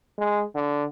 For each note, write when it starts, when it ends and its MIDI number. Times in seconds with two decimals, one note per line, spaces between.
0.18 0.43 56
0.55 0.84 50